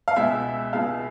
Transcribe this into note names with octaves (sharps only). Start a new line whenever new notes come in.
F5
C#2 B2 G#3 E5
C#2 B2 G#3 F5